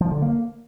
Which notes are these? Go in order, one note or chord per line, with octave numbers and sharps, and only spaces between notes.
F3
D3
A#3